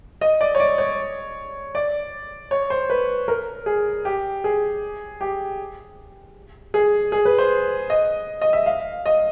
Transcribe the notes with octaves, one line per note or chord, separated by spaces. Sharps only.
D#5
D5
C#5
D5
C#5
D5
C#5
C5
B4
A#4
G#4
G4
G#4
G4
G#4
G#4
B4
C5
D#5
D#5
E5
F5
D#5